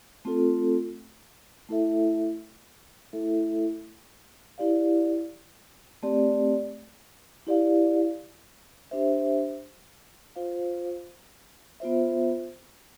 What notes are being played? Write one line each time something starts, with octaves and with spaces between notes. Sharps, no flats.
A3 C4 F4 A4
A3 E4 A4 E5
A3 E4 A4 E5
E4 G4 D5 F5
A3 C4 G4 D5
E4 G4 D5 F5
D4 G4 C5 E5
F4 C5 F5
B3 F4 C5 E5